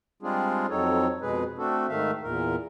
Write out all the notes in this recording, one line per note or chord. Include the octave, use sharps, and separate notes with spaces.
G3 G#3 C4 D4 F4 G#4
F2 F#3 C4 D#4 A4 C#5
F2 B2 G#3 G#4 B4
A3 C4 D4 F#4 A4
G#2 D#3 A3 E5 F5
E2 A#2 A#4